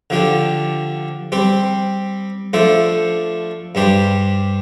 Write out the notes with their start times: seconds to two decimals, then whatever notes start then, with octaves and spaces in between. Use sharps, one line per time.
0.10 D3 F3 D4 G4
1.32 G3 C4 G4 C5
2.53 F3 A3 D4 A4 C5
3.75 G2 G3 D4 G4 C5